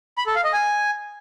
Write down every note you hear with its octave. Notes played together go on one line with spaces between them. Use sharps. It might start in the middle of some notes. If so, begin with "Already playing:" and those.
B5
A4
F5
D#5
G#5